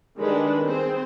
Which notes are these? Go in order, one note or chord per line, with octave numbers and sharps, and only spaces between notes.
D#3 G3 G#3 D4 G#4 B4
C4 G#4 C5